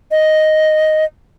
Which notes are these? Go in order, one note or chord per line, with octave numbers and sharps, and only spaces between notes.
D#5